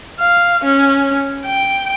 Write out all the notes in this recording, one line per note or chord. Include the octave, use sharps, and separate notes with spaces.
F5
C#4
G5